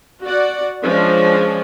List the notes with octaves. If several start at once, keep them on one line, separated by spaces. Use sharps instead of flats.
F#4 D5 F#5
F3 G#3 C#4 D4